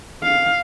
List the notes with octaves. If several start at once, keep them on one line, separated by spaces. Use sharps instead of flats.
F5